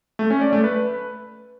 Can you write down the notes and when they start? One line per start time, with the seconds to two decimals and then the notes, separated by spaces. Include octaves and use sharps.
0.19 A3
0.30 C#4
0.41 D5
0.53 A3
0.64 B4